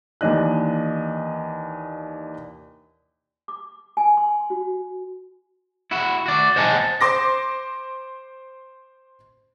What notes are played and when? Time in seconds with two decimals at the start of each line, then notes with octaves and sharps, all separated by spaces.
0.21 D#2 E3 D4 D#5 F#6
3.48 D6
3.97 G#5
4.17 C6
4.50 F#4
5.91 E4 F#4
6.26 F#4 D5
6.56 C5 D#5 F#5 G#5 A5
7.01 C5 C6 D6 A#6